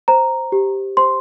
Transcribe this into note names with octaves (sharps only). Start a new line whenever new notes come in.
C5 A#5
G4
C5 C6